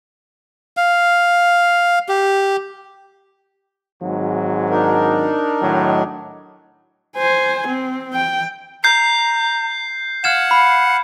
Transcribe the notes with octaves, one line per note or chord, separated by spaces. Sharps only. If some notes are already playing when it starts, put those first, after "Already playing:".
F5
G4
G#1 G#2 F#3
D4 D#4 A#4
A2 D#3 F#3
C5 G#5
C4
G5
A#5 G6 C7
F5 F#5 F6 G#6 E7
B5